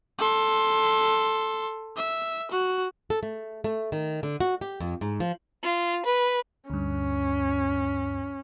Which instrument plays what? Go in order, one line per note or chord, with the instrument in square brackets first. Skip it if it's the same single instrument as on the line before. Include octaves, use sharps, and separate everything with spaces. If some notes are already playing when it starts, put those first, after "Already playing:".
[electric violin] A4 C6
E5
F#4
[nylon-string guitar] A4
A3
A3
D#3
D3
F#4
G4
F2
G#2
F3
[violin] F4
B4
[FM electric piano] D2 G2 [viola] C#4